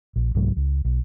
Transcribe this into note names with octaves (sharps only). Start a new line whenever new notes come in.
A#1
C2 G#2 F#3 G#3
C#2
B1